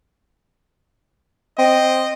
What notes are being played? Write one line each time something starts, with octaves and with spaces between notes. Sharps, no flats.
C4 D#5